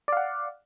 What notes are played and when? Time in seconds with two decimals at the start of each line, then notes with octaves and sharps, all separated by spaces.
0.08 D5
0.12 F5
0.17 F#5